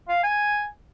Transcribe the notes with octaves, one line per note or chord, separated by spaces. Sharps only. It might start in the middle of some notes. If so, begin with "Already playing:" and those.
F5
G#5